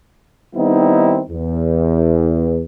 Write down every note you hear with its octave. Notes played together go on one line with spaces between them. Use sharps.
D#3 G3 B3 C4 D#4 E4
E2